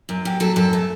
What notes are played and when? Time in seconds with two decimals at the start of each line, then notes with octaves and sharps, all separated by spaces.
0.09 F#2
0.25 F#2 G4
0.40 F#3 A4
0.56 F#2 A4
0.73 A3